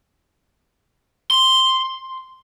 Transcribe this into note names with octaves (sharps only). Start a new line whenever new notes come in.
C6